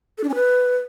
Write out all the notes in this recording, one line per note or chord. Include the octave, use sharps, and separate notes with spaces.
A4
D4
C#4
B4